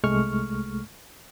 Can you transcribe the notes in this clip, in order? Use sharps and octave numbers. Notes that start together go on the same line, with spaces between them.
C2 G#3 A3 C#6 F6